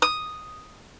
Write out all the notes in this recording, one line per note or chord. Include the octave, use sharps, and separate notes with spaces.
D#6